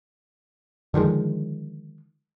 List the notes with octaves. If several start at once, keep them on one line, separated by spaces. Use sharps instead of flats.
D3 D#3 F3 G#3